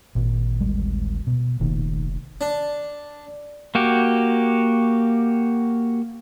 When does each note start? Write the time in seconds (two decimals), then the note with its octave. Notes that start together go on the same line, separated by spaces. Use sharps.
0.15 G#1 A#2
0.60 D1 G3 G#3
1.27 B2
1.60 F1 A#1 A#2 D#3
2.41 D4
3.75 A#3 F#4 G4